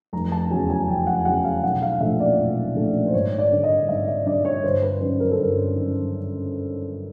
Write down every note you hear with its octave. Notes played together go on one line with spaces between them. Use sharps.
F1 A#5
A5
E2 C#3 F#3 G#5
G#5
F1 G5
F#5
E2 C#3 F#3 F#5
F5
B1 F#5
F5
F5
A#2 F3 A3 D4 E5
D5
B1
A#2 F3 A3 D4
C5
G#1 C#5
D5
G2 D3
D#5
G#1 E5
E5
G2 D3 D5
C#5
G1 C5
B4
F#2 D#3 B4
A#4
A4
G1 A#4
F#2 D#3